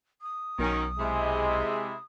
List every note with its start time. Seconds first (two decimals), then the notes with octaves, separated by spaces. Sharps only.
0.22 D#6
0.59 B1 D#3 F#3 C#4
0.99 C3 G#3 E4